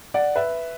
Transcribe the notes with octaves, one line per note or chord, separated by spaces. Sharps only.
D5 F#5
B4 E5